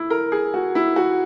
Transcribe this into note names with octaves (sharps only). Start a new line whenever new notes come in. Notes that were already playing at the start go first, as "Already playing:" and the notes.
Already playing: E4
A#4
G#4
F#4
E4
F#4